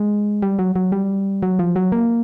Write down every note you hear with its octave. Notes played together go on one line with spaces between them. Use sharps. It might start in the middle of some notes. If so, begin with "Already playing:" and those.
Already playing: G#3
G3
F#3
F#3
G3
F#3
F3
F#3
A#3